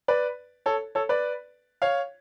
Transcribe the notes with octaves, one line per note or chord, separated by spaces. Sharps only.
B4 D5
A4 C#5
A4 C#5
B4 D5
C#5 F5